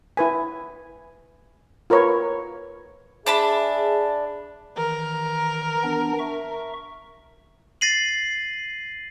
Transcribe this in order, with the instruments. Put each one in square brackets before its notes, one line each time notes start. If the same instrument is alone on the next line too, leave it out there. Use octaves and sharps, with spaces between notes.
[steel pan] E4 B4 G#5
F4 A#4 B4 C#5
[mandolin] D4 A5 B5 [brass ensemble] G#4 E5
[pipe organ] D#3 E3 [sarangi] A#4
[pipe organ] E3 B3 D4
E5 C#6
[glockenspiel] A6 A#6 C7 D#7 F#7